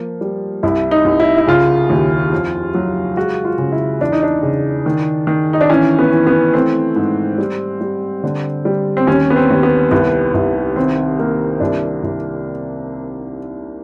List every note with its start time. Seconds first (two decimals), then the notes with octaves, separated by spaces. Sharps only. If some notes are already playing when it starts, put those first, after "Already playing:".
Already playing: F3 A#3
0.21 G3
0.63 C2 E4
0.91 D#4
1.05 C2
1.20 E4
1.37 E4
1.47 C#3 F4
1.90 D#2
2.32 F2
2.74 F#3
3.16 G#3 F#4
3.45 F4
3.58 C#3
3.72 E4
4.00 E2 D4
4.12 D#4
4.23 D4
4.43 C#3
4.86 D#3
5.27 D#3
5.53 D#4
5.61 D4
5.70 E3 C#4
5.99 B3
6.12 E3
6.27 B3
6.54 A3 C4
6.96 G#2
7.38 G3
7.81 G3
8.24 D3
8.65 G3
8.97 C4
9.07 D#2 C#4
9.30 B3
9.36 C4
9.50 D#2
9.63 B3
9.91 C2 B3
10.34 C2
10.76 D#3 C4
11.19 A#3
11.60 C2 D4
12.03 C2